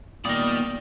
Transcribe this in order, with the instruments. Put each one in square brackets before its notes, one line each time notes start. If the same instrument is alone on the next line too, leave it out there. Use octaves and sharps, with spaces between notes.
[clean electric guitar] A#2 D#3 [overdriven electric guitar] G3 D5 [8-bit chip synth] A#3 B3 [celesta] D#6 A#6